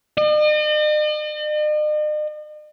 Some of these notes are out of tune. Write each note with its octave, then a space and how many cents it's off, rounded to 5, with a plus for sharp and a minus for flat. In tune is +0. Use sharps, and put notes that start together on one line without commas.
D#5 -45